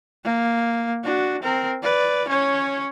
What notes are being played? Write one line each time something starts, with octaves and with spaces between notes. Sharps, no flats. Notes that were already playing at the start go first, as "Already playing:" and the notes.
A#3
D4 F#4
C4 A#4
B4 D5
C#4 C#5